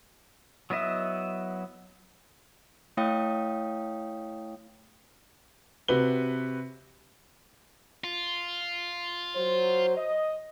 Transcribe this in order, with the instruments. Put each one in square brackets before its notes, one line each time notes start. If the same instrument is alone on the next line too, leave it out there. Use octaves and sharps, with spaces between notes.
[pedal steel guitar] F#3 B3 E4 D#5 E5
[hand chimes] A3 E4 C#5 F5 G5 D#6
[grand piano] C3 F#4 B4 G7
[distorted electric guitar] F4
[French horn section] F#3 C5
D#5